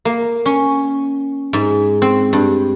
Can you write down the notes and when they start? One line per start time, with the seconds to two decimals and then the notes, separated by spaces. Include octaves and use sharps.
0.05 A#3
0.46 C#4
1.53 G#2
2.02 C4
2.33 G2